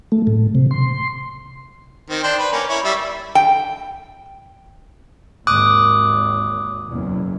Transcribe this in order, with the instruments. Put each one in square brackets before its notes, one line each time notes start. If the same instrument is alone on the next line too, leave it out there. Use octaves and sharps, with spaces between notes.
[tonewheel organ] A3
A2
C3
C6
[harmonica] D#3 C4
D4 C5 G5
B4
A#3 C#4
E4 C#5
G3 E5
[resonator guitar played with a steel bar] G5
[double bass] G#1 D#2 [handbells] D6 D#6 F#6
[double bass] F#1 E2